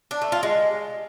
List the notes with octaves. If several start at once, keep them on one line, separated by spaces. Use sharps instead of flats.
D4
A3
F4
G#3